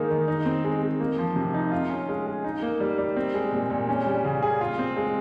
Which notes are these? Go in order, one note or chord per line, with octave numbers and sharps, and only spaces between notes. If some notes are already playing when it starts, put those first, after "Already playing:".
Already playing: D#3 G#3 A#3 D#4
D#3
D#4
C4
G#3
G#3
A#3
F3
C3
D#4
F4
C#4
G#3
G#4
D#4
A#3
G3
G3
C4
G#3
A#2
A#2
C#4
G3
C#3
G#4
F4
C4
G#3